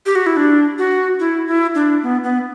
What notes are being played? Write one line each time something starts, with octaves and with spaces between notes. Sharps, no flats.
G4
F#4
E4
D4
F#4
E4
E4
D4
B3
B3